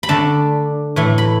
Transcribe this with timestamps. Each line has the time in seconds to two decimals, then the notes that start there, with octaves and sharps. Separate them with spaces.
0.03 B5
0.09 D3 A3 D4 A5
0.96 A2 E3 A3
1.18 B5